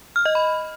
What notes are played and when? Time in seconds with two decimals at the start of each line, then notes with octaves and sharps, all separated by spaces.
0.16 F6
0.26 D#5
0.35 B5